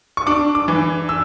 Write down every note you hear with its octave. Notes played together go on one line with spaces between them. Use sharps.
C#6
D4 D6
D6
E3
E6